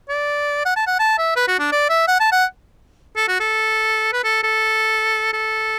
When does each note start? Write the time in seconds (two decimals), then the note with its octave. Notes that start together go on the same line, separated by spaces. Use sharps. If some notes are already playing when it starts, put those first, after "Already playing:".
0.09 D5
0.65 F#5
0.76 A5
0.87 F#5
0.99 A5
1.18 E5
1.36 B4
1.48 F#4
1.59 D4
1.72 D5
1.89 E5
2.08 F#5
2.20 A5
2.32 F#5
3.16 A4
3.28 F#4
3.40 A4
4.13 B4
4.24 A4
4.43 A4
5.33 A4